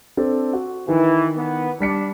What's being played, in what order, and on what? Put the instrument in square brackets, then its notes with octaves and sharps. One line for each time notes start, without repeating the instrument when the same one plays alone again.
[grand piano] C4 D4 A4
F#4
[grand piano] D#3 [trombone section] E3
[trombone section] B3
[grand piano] G3 B6 C#7 [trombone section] D4